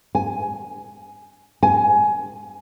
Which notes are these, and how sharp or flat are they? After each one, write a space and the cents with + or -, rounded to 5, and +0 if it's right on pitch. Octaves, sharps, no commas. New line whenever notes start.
G#5 +10
G#5 +15